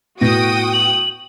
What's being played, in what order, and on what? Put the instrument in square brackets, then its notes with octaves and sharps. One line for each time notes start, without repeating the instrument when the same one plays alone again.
[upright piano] A2 B3 [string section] F#4 G5 D#6 [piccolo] A#6
[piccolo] F#7